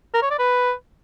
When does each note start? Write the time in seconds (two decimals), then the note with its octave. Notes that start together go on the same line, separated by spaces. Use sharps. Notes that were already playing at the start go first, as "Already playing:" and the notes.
0.14 A#4
0.22 C#5
0.31 D5
0.39 B4